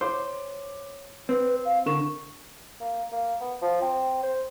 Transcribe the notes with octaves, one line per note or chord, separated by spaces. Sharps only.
C5 C#5 D6
C4 B4
F5
D3 A#4 C#6 E7
A#3
A#3
B3
F3
C4
C5